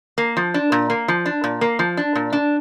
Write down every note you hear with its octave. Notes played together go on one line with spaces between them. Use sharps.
A#3
F3
D4
A#2
A#3
F3
D4
A#2
A#3
F3
D4
A#2
D4